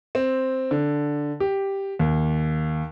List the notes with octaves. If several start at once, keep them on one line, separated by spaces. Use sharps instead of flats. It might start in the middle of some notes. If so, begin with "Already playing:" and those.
C4
D3
G4
D#2